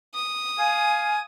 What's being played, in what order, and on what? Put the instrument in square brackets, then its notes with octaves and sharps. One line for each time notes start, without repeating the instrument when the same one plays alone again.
[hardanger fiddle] D#6
[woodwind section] F5 G#5